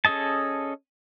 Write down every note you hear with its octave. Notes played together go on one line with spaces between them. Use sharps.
C#4 G#4 A4 D#5 A5